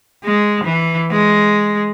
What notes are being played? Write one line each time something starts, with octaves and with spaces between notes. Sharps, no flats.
G#3
E3
G#3